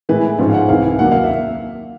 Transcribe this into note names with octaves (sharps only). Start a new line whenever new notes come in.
A2 E3 G#3 B4
G#2 F3 G#3 C#4
F5
F#5
C2 C3 E3 F5
D#2 D3 F#3 A#3 D4 F#5
F5
E5